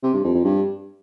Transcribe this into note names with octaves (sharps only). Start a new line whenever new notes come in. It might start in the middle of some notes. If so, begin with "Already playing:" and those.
C3
G2
F2
F2
G2